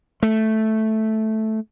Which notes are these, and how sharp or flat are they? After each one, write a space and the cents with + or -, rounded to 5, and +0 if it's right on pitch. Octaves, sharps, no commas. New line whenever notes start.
A3 -5